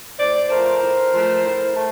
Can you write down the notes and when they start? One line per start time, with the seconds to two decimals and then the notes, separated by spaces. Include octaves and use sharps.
0.19 A2 C5 D5
0.50 F3 A3 A#4 C5
0.82 A2
1.12 F3 A3
1.44 A2
1.75 A3